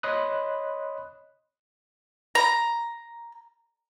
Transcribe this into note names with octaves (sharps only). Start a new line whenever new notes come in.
C#5 D#5 B5 C6 D#6 F#6
A#5